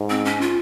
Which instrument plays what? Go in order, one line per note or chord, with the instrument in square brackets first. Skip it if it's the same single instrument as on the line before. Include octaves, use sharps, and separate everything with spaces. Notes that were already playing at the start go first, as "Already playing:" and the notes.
Already playing: [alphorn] G#2
[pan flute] C4
C#4
F4